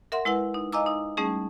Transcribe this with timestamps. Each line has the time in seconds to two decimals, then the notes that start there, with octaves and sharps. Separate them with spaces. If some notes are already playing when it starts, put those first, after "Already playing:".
0.12 A#4 E5 F#5 C6
0.25 G#3 E4 B4 F#5
0.54 D#4
0.72 D#5 F5 G#5 A#5 D6 E6
0.86 D#4
1.17 G3 A3 C#4 D#4 G#4